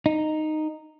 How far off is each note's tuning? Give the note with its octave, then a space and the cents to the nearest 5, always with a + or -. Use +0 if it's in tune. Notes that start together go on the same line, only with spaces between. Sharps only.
D#4 -10